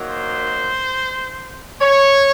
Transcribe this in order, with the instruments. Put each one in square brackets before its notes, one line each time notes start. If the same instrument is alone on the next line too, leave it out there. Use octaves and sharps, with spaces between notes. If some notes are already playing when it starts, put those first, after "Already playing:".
Already playing: [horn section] D#3 F#3 A#3
C5
C#5